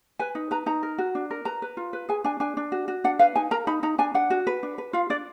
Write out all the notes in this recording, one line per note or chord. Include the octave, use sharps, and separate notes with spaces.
B4 G#5
D#4
B4 A#5
D#4 A#5
A#4
F#4
D4
A#4
B4 A#5
B4
F4
B4
G#4 G#5
D4 G#5
D4 G#5
D4
F#4
F#4
D4 F#5
B4 F5
D#4 G#5
A#4 A#5
D#4 B5
D#4 A#5
D4 G#5
D4 F#5
F#4
B4
D4
B4
F4 F5
D4 D5